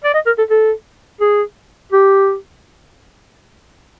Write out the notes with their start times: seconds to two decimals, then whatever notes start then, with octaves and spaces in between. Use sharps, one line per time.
0.04 D5
0.14 D#5
0.26 A#4
0.38 A4
0.50 A4
1.21 G#4
1.92 G4